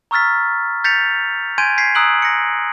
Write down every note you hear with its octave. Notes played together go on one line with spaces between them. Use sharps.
A#5 C#6 E6 F6 A6 B6
G6 A6 B6 C#7 F7
G#5 C6 G6 G#6 D7 D#7
G#6 B6 C7
A#5 D#6 E6 F#6 D7 F#7
A#6 C#7